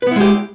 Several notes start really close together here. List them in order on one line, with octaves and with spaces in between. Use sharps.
B4 B3 E4 G#3 G4